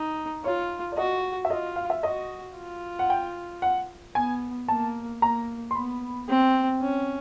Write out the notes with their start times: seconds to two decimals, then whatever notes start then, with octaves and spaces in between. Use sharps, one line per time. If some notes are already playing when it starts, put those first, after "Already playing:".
Already playing: D#4
0.44 F4 C#5
0.92 D5
0.97 F#4 D#5
1.45 E5
1.50 F4 D#5
1.76 F5
1.90 E5
2.03 F#4 D#5
2.57 F4
2.99 F#5
3.10 G5
3.62 F#5
4.15 B3 G#5
4.68 A#3 A5
5.21 A#3 A#5
5.71 C6
5.75 B3 B5
6.28 C4
6.81 C#4